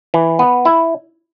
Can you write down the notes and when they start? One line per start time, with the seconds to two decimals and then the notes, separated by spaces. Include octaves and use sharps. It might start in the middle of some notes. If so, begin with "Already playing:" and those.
0.14 E3
0.39 B3
0.65 E4